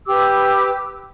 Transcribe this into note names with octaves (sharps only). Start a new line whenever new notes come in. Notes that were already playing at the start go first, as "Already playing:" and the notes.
G4 B4 D6 E6